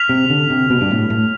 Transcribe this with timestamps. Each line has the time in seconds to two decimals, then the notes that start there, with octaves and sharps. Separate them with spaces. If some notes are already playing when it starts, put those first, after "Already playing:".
Already playing: F6 B6 F7
0.09 C3
0.30 D3
0.50 C3
0.70 B2
0.81 G2
0.91 A2
1.10 A2